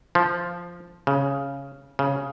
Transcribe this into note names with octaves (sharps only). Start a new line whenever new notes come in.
F3
C#3
C#3